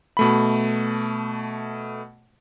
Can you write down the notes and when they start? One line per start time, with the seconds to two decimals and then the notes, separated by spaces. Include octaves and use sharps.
0.17 B2 A3 B5